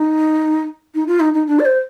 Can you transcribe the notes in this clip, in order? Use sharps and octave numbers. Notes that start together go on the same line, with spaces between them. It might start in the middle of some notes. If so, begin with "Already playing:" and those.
Already playing: D#4
D#4
F4
D#4
D#4
D4
D5
C5